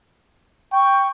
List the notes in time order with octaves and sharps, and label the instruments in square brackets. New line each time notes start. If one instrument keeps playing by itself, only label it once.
[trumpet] G5 [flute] C#6